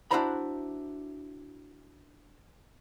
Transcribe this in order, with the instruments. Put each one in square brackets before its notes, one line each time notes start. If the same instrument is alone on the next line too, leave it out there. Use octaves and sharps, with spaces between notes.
[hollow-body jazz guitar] D4 E4 F#4 C5 A#5 B5